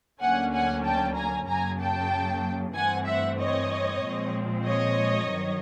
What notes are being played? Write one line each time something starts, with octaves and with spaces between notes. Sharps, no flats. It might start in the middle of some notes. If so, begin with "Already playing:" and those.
D2 D3 F#3 A#3 C#4 F#5 G#5
F#5 G#5
G5 A5
G#5 A#5
F#2 C#3 F#3 A#3 G#5 A#5
G5 A5
G2 E3 A3 C4 F#5 G#5
E5 F#5
C#5 D#5
A#2 F3 G#3 C4
C#5 D#5
G2 D#3 F#3